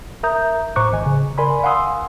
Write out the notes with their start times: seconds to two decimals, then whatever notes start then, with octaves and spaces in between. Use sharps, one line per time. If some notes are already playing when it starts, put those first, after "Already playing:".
0.23 A#4 E5 A#5 D#6 G6
0.76 A2 C5 A#5 C#6 D6 F#6
0.92 G#1 D#5 G#5
1.06 C#3
1.38 A#4 D5 G#5 B5 C6
1.63 F5 F#5 G#5 C6 D#6 E6